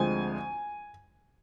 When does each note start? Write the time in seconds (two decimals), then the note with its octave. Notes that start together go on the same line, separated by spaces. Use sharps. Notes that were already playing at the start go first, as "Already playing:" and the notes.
Already playing: D2 D3 F3 G#3 C4 G#5